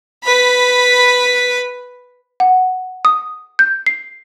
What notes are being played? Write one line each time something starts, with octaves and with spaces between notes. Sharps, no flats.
B4 B5
F#5
D#6
G6
C7